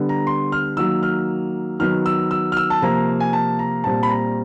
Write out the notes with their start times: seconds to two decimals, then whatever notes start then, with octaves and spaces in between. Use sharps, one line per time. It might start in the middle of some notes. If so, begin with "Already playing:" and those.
Already playing: D3 G3 B3
0.09 A#5
0.27 C6
0.52 F6
0.77 D#3 F#3 A#3 E6
1.03 F6
1.79 D#3 F#3 B3 F6
2.06 E6
2.31 E6
2.52 F6
2.57 E6
2.70 A5
2.82 C3 F3 A#3 A#5
3.20 G#5
3.33 A5
3.59 A#5
3.84 A#2 G3 C4 A5
4.03 B5
4.10 A#5